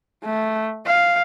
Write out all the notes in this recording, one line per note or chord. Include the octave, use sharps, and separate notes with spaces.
A3
F5